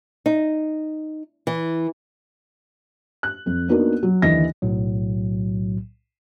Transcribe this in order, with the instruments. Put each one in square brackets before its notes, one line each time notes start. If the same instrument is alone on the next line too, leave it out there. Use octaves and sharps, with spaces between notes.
[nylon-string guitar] D#4
E3
[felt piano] F#6
F2
A#3 B3 D4 D#4 F#4 A#4
F#3
D#2 D3 E3 D#5 A#6
[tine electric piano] B1 A2 F#3